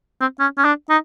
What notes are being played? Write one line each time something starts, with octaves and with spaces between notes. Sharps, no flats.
C4
C#4
C#4
D4
D#4